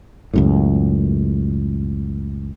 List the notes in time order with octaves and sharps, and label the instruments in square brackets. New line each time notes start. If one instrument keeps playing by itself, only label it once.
[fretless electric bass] C#2 F#2 A2